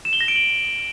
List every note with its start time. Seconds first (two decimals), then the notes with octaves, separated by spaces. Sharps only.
0.05 E7
0.13 G7
0.21 A#6
0.28 D7
0.36 F#7